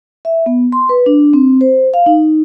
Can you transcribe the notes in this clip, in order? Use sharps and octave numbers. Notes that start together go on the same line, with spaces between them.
E5
B3
C6
B4
D4
C4
C5
F5
D#4